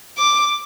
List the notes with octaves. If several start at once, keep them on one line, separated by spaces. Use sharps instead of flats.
D6